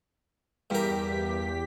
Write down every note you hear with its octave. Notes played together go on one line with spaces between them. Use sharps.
E2 G2 G4 A#4 B6